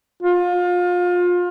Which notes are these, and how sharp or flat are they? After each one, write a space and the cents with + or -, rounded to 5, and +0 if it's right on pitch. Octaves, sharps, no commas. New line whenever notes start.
F4 +30